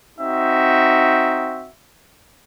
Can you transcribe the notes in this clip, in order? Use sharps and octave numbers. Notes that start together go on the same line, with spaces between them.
C4 D#4 F#4 E5